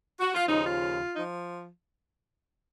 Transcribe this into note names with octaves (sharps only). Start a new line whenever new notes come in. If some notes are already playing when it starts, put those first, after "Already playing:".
F#4
F4
D#2 C#3 F3 D#4
F4
F3 D#4